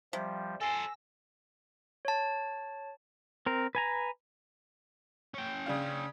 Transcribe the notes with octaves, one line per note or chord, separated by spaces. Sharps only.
C3 F3 G3
A4 C5 G#5 E6 A#6
C#5 A5
C4 A#4
B4 G#5 A#5
C#4 G5
C#3 D4 F5